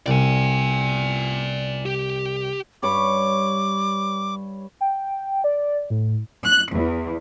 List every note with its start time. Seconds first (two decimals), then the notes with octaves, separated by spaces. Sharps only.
0.06 C2 D5 G#5
1.86 G4
2.83 G2 C#5 B5 D6
4.81 G5
5.44 D5
5.90 A2
6.45 F#6
6.74 E2